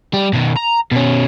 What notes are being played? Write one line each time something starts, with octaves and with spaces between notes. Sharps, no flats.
G3
B2 D#3
A#5
B2 C#4